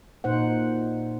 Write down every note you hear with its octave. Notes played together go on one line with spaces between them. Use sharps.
A#2 D#4 C5 F#5